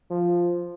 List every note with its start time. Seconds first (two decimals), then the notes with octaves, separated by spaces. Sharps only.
0.10 F3